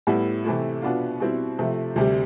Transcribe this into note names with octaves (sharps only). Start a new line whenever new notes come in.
A2 G3 B3 E4
C3 E3 A3 E4
B2 B3 D4 F4
B2 G3 C4 E4
C3 F3 A3
D2 C3 G3